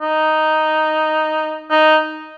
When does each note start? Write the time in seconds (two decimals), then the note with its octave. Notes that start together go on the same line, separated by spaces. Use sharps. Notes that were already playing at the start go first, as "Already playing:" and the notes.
0.01 D#4
1.71 D#4